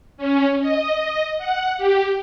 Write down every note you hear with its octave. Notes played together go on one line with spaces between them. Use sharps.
C#4
D#5
F#5
G4